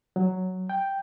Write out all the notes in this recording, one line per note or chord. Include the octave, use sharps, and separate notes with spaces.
F#3
G5